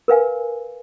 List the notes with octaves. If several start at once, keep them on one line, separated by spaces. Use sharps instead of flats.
A#4 B4 F5 G#5